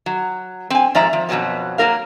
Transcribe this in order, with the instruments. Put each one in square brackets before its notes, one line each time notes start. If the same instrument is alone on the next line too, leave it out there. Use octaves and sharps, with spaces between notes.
[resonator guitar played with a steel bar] F#3
C4 G#5
G#2 F3 D5 E5 A#5
F3
F2 B2 F3 F#3 B3
F#3 A#3 A#4 F5